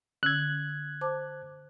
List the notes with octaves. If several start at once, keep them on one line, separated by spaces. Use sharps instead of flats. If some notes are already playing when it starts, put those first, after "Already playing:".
D3 C#4 E6 F#6 G#6
C5 A5 D6